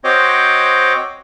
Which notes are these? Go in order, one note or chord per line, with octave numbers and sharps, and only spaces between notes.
C4 F#4 C5 C#5 D#5 D6